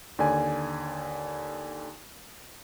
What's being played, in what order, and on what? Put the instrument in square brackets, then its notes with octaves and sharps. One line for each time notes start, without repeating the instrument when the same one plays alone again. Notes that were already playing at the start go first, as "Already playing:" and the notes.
[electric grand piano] D#2 D3 D5 G#5